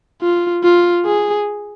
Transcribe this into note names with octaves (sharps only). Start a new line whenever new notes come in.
F4
F4
G#4